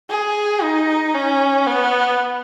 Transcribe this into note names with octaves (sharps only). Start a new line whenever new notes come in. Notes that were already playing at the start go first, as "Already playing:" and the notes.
G#4
D#4
C#4
B3